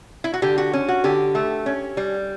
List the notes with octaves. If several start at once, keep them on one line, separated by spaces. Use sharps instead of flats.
E4
F#4
D3 G4
F#4
C#4
F#4
D3 G4
A3
C#4
G3